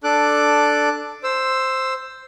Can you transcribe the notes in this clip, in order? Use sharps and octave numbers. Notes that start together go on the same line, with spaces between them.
D4 A4 D6 F#6
C5 E6